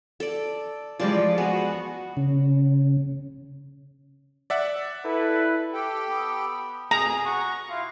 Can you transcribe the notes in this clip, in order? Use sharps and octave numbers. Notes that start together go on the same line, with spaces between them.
A4 D5
E3 F3 G3 G#3 F4 D5 A5
B3 F#4 G#4
C#3
D5 E5 F#5
E4 A4 B4
G4 A4 G5
B3
F2 B2 G#4 A#5
F#4 C#6
E4 F4 F5